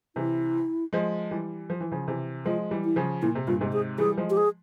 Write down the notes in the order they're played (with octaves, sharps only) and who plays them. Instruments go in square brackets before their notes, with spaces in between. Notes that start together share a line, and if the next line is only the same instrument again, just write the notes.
[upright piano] C3 E3 [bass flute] E4
[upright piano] F3 G#3
E3 G3
F3
E3
C#3 F3
C3 E3
[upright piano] F3 G#3 [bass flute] F4
[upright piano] E3 G3
[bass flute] E4
[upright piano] C#3 F3
[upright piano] A#2 [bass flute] E4
[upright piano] C3
[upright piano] G2 A#2 [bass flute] F4
[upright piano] G#2 C3
[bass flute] G#4
[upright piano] E3 G3 [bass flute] G#4
[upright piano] F3 G#3
[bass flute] G4
G#4